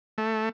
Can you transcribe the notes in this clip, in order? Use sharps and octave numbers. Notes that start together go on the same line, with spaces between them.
A3